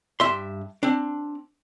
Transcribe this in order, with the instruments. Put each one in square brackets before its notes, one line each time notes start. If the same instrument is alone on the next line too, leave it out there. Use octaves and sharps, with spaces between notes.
[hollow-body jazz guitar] G2 E5 C6
C4 D4